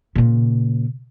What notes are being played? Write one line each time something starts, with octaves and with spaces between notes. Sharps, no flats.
A#2 C#3